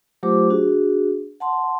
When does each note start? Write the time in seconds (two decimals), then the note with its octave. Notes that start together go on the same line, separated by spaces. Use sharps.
0.23 F#3 A3 F4 G4 C5 D6
0.50 D4 F#4 G#4
1.40 F#5 A5 C6